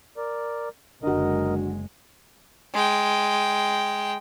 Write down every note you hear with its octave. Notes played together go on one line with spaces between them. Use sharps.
A#4 D5
F#1 D3 G#3 F#4 A#4 D#5
G#3 G5